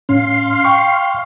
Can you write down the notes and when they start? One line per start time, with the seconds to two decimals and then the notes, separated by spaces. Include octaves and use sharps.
0.09 A2 C#4 F5 C6
0.65 G5 C#6